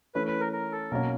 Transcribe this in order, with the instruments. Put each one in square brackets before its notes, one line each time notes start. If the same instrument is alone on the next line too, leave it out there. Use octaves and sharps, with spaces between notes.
[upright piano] E3 A3 C#4 [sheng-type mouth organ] B4
[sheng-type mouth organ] B4
A#4
A#4
A4
[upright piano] B2 F#3 A#3 C#4 [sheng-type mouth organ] A#4